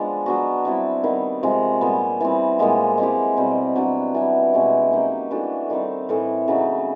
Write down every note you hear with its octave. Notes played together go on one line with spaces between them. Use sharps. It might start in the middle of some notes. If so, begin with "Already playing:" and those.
Already playing: F3 G#3 B3 D4
F#3 B3 D4 F#4
G3 C4 E4
D#3 G3 B3
C3 F3 G#3
A#2 G3 B3
E3 G3 C4
A#2 F3 G#3 B3
G#3 C4 E4 G4
B2 G3 C4
F#3 B3 D4 G4
E3 G3 B3 E4
B2 G#3 C#4 E4
F#3 A#3 D#4 G4
E3 A3 D4 F#4
D#3 G3 C4 D#4
A2 E3 A3
C#3 F#3 B3 D#4